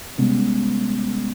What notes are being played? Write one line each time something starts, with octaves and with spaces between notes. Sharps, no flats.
C3 G3 G#3 B3 C#4